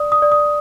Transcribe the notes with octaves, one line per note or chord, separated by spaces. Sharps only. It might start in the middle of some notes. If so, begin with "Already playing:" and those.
Already playing: D5 D#6
D#6
D5
D#6